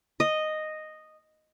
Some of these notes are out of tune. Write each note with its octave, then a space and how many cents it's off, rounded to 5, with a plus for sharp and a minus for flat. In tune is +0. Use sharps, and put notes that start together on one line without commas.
D#5 -5